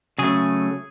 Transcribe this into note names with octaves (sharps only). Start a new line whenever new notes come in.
C#3 F#3 A3 G#4